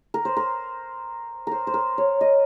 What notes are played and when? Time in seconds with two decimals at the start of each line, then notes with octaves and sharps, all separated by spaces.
0.14 A#4
0.25 C5
0.37 A#4
1.47 A#4 C5
1.67 C5
1.74 A#4
1.98 C#5
2.21 D#5